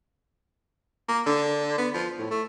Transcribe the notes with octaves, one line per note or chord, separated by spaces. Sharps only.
A#3
D3
B3
F3
A2
A3